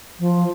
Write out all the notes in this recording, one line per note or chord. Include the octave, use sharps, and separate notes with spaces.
F3